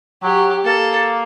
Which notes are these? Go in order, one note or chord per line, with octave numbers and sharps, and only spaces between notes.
F#3 G4
A#3 A4